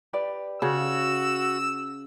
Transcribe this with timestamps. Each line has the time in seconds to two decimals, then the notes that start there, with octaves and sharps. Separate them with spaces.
0.13 G4 B4 D5
0.62 C#3 F#4 E6